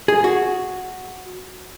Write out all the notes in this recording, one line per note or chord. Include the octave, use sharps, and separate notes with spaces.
G#4
F#4